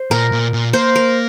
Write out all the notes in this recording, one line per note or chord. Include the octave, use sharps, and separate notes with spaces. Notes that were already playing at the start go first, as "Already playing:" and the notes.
Already playing: C5
A#2 A#4
A#2
A#2
A#3 C5
A#4